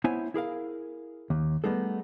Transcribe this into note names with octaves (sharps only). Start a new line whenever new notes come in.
B3 E4 C5 C#5 E5 G#5
E4 G#4 A#4 F5
D#2
G3 A3 B3 D#4 G#4 A4